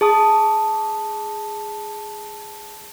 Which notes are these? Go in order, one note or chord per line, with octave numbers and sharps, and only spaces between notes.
G#4 A5 D#6